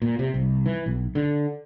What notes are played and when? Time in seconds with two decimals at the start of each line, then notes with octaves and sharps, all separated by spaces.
0.02 A#2
0.19 C3
0.34 C2
0.66 E3
0.86 B1
1.15 D3